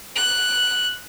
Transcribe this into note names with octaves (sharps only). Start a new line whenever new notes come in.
F#6